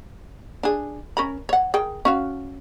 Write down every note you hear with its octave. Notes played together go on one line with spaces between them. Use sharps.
D4 G#4
C#4 A#4 B5
C#5 F#5
G#4 A#4 G5
C#4 F#4 F5